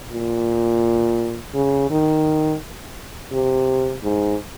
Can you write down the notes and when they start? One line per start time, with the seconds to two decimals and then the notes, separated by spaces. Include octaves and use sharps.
0.12 A#2
1.54 C#3
1.90 D#3
3.32 C3
4.03 G#2